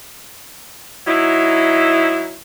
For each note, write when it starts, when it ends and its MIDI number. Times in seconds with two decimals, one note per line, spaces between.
1.07 2.35 54
1.07 2.35 63
1.07 2.35 64